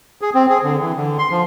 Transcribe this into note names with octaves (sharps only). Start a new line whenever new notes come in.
G#4
C4
G#4
D3
E3
D3
C6
F3